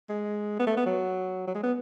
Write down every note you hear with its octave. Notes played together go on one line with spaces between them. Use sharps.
G#3
B3
A3
B3
F#3
F#3
G#3
B3